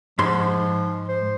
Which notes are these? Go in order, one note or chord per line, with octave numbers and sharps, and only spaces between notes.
G#2 F3 C6
C5